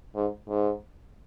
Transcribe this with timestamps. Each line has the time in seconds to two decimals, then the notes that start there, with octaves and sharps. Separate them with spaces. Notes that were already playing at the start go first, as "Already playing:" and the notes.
0.15 G#2
0.49 G#2